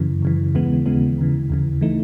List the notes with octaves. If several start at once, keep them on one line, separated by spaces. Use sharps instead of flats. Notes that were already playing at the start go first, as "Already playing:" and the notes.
Already playing: F#2 C#3 E3
F#2 C#3 E3
D#2 C#3 E3 G#3 B3
D#2 C#3 E3 G#3 B3
D#2 C#3 E3
D#2 C#3 E3
E3 A3 D#4